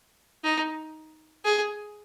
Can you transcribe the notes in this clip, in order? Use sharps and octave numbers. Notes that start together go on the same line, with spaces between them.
D#4
G#4